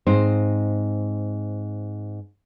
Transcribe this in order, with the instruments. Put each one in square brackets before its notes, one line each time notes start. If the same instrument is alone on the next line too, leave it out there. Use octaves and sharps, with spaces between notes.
[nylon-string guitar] G#2 C4 D#4 C5